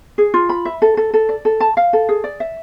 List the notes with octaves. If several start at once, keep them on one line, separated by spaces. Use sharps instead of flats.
G#4
F4
B5
E5
A4
A4
A4
D5
A4
A5
F5
A4
G#4
D5
E5